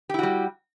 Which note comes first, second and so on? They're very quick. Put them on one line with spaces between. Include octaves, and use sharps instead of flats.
G4 E4 F#4 G3